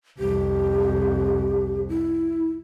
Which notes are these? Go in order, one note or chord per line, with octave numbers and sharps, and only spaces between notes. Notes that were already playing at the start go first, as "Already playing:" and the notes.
C2 F2 G4
E4